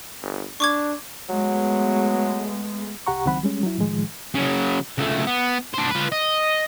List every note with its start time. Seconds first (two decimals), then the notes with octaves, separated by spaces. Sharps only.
0.22 G1
0.60 D4 C#6 D6 G#6
1.29 F#3 G#3 A3 B3
3.07 C2 G4 F#5 A#5 C#6
3.25 C#2 D#3 F#3 C4 F#5 B5
3.43 G3 G#3 C#4
3.63 F#3 E4
3.78 A2 D#3 F3 G#3
4.35 C#3 F#3
4.98 C#2 A3
5.27 B3
5.74 D4 C5
5.91 F4 B4
6.12 D#5